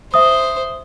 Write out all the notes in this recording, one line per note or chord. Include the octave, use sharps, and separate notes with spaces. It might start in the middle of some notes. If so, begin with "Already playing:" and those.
C5 E5 D#6